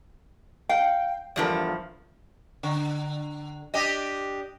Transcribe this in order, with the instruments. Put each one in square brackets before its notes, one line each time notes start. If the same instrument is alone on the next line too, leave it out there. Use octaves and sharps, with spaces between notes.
[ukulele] F5 [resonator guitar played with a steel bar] G5
[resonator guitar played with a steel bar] E2 G2 F3 [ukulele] A4 A#4 D5
[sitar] D3
D4 G4 D#5